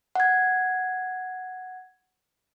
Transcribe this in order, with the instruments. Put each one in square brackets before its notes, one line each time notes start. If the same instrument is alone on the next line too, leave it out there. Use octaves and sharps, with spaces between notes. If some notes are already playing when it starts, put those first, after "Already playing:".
[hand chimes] F#5 G#6